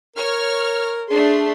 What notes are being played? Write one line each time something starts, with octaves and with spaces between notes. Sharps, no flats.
A#4 C#5 F6
A3 D4 G#4 C6